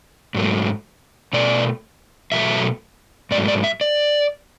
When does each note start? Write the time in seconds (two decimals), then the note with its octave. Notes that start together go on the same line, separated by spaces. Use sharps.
0.34 G#2 F#3 A3
1.33 B2 A3 D5
2.32 B2 F#3 A3 E5
3.31 G#2 F#3 A3 D5
3.48 D5
3.64 E5
3.81 D5